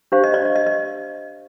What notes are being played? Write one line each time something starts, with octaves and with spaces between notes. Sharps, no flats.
D4 G4 C5 F5
D#5
D5
D#5
D#5
D#5